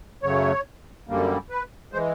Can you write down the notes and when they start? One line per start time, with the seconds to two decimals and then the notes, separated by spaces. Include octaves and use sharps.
0.23 F#2 C#3 F#3 A3 C#5
1.08 F#2 D3 G3 A#3
1.50 B4
1.92 E3 G#3 C5